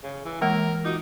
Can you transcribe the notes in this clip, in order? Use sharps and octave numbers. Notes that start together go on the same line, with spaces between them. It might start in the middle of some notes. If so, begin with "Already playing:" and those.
C#3
E3
E3 G#3 A#3 A#4
D#4 F4 F#4